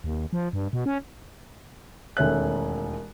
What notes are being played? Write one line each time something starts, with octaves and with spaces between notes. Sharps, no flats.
D#2
F3
G2
B2
C#4
E1 D#2 A3 C#4 E5 F#6